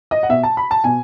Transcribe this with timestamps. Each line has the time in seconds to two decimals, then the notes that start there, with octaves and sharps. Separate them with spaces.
0.11 D#5
0.23 F#5
0.29 B2 E5
0.43 A5
0.57 B5
0.71 A5
0.84 B2 G#5